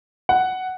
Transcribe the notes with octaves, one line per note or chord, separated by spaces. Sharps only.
F#5